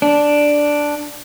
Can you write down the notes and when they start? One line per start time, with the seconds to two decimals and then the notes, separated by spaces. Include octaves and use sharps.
0.02 D4